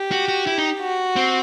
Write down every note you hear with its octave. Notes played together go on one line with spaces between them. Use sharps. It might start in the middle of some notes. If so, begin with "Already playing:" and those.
Already playing: G4
F#4
F#4
E4
D#4
F#4
C4